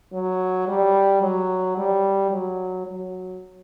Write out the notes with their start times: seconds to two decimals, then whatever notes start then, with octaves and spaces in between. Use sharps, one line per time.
0.13 F#3
0.68 G3
1.22 F#3
1.77 G3
2.32 F#3
2.87 F#3